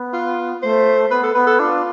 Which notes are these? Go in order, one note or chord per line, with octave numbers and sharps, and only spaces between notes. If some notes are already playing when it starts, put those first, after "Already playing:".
Already playing: B3
F4
A3 C5
B3 B4
A4
B3 B4
A4
D4 F4